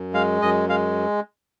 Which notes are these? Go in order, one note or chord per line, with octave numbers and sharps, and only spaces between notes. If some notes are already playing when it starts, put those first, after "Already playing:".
Already playing: F#2
G#3 F5
F#2 D#5
G#3 F5